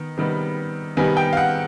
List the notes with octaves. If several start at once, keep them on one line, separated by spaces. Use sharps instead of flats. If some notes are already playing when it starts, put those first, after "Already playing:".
Already playing: D#3 B3
C3 D#3 G3 B3
C3 D#3 G3 B3 G#5
G5
F5
F#5